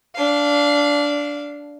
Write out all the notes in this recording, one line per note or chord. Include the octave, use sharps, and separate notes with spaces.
D4 F5